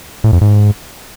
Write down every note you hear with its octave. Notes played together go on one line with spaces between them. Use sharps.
A2
F2
G#2